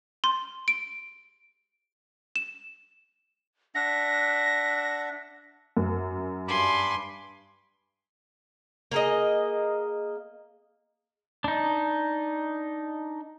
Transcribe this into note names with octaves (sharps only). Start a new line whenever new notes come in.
C6
D7
E7
D4 E5 F#5 A#6
F#2
G2 G#5 B5 C6 D6
A#3 G#4 D#5
D4 D#4